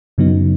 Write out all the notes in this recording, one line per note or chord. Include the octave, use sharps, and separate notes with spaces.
F#2 C#3 F#3 B3 D#4